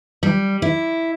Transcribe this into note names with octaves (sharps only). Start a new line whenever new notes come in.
G3
E4